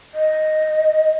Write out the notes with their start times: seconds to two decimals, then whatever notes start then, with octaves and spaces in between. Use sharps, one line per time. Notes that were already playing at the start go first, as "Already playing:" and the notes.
0.15 D#5